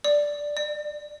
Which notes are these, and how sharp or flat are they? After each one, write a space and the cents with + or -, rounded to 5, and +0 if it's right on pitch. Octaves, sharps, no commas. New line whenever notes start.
D5 +0
D5 +35